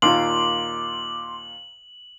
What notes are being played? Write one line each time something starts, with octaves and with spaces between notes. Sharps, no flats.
D#2 A#2 C6 D6 F#7